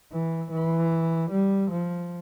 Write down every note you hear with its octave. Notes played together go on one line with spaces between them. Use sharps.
E3
E3
G3
F3